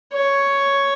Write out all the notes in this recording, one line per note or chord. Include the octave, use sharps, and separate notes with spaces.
C#5